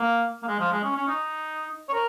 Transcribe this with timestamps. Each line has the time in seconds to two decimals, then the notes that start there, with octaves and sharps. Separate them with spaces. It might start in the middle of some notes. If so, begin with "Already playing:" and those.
Already playing: A#3
0.43 A#3
0.47 G#3
0.59 F3
0.72 G#3
0.83 C#4
0.96 C#4
1.08 D#4
1.89 C#5
1.93 A#4